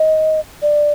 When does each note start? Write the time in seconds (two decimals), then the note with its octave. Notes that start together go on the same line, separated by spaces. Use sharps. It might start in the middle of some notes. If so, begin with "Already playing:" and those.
Already playing: D#5
0.62 D5